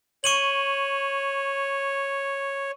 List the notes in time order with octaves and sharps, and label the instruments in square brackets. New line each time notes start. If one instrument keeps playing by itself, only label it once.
[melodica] C#5 [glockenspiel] C#6 D#7 F#7